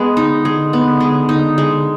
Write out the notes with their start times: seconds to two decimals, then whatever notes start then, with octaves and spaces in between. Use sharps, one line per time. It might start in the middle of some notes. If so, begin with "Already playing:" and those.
Already playing: G#3 B3
0.17 D3 D#4
0.45 G#3
0.73 B3
1.00 G#3
1.29 D#4
1.58 G#3